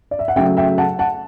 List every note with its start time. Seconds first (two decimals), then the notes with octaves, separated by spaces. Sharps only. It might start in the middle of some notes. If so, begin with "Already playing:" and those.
0.11 D5
0.19 E5
0.28 F#5
0.36 C#3 F#3 A3 E5 G5
0.57 E5 G5
0.78 F#5 A5
0.99 F#5 A5